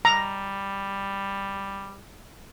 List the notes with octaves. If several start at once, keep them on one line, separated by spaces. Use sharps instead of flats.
G3 A#5